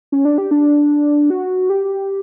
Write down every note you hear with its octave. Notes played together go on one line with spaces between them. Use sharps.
C#4
D4
G4
D4
F#4
G4